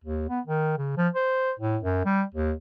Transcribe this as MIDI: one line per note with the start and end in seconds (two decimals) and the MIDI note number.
0.04 0.25 39
0.29 0.40 59
0.47 0.77 51
0.78 0.97 49
0.97 1.08 53
1.15 1.52 72
1.59 1.77 45
1.83 2.04 42
2.05 2.23 55
2.34 2.52 39